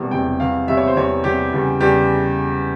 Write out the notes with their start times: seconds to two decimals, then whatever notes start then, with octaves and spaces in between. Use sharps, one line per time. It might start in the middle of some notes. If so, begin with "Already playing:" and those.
Already playing: E1 E2 C3 G3
0.11 E1 E2 C3 G3 G5
0.40 E2 C3 G3 F5
0.68 E2 C3 G3 E5
0.77 C#5
0.87 C5
0.96 E2 C3 G3 C#5
1.24 E2 C3 G3 G4
1.53 E2 C#3 G3
1.81 E2 C#3 G3 G4